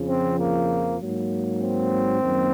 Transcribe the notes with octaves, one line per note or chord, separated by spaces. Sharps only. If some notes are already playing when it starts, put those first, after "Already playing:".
Already playing: F2 C#3 F3
C4
A#3
G#2 F#3 A#3
C4
F#2 D#3 A#3